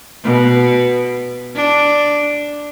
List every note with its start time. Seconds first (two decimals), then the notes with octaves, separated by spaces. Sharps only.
0.24 B2
1.56 D4